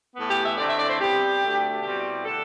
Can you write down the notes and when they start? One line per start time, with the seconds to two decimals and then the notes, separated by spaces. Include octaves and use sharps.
0.16 A2 E3 B3
0.30 G4
0.44 E5
0.58 D3 A3 C4 E4 D5
0.68 E5
0.78 D5
0.89 C5
1.00 C3 G3 B3 G4
1.41 D2 D3 A3
1.83 B2 G3 C4 E4 G4
2.25 D3 A3 D4 A4